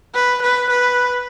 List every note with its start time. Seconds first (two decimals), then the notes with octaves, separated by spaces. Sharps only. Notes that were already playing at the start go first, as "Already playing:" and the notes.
0.14 B4
0.42 B4
0.70 B4